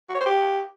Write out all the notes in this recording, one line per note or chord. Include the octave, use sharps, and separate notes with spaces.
F#4
C#5
C5
G4